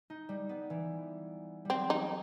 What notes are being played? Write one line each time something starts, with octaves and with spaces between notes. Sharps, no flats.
D#4
G3
B3
E3
F#3 G3 C4
D#4